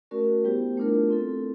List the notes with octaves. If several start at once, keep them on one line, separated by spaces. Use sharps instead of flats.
A3 C#4 F#4 A#4 D5
G3 B3 E4 G4 C5
A3 D4 F4 A#4
C4 E4 A4